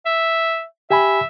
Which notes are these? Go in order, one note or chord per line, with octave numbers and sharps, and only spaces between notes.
E5
G4 E5 G#5 B5